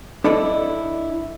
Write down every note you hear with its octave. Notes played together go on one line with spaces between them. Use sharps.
D4 E4 A4 D5 D#5